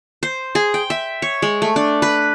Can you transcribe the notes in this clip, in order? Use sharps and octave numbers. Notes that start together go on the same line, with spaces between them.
C5
G#4
G5
E5
C#5
G#3
A3
D4
B4